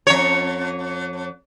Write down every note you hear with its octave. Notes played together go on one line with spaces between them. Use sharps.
F2 C#5